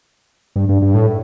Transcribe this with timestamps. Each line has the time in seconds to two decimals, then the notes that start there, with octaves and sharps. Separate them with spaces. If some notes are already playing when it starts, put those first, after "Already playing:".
0.56 G2
0.69 G2
0.82 G2
0.94 A2